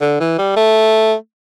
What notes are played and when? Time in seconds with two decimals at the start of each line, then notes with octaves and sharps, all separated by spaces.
0.01 D3
0.20 E3
0.39 G3
0.56 A3